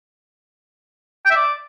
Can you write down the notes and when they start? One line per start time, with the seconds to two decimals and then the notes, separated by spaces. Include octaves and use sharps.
1.25 G5
1.31 E5
1.36 D5